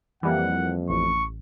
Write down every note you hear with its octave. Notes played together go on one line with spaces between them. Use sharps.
F2 E3 G3 A#3 F#5
A1 C#6